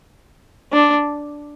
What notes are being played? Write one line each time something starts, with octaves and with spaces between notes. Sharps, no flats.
D4